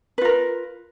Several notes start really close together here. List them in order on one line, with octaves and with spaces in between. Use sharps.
B4 F4 A#4